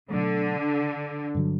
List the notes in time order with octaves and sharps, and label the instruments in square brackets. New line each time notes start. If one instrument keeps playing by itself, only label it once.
[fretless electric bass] B2 F#3 A3 [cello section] D3
[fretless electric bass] G2 D3 F#3